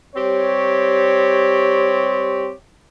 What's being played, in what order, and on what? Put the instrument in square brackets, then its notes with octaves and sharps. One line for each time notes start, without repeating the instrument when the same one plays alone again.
[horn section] G3 C4 G4 C#5